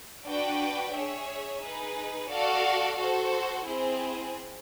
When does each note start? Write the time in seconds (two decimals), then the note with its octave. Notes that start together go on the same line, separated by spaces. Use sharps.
0.25 D4 F#4 B4 D5 G5
0.93 G#4 C#5 E5
1.61 D#4 G#4 B4
2.29 F#4 A4 D5 F5
2.98 F#4 A4 C5
3.66 C4 E4 G#4 C5